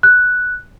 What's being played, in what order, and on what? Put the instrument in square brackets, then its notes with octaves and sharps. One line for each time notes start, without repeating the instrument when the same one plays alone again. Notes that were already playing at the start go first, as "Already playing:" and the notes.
[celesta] F#6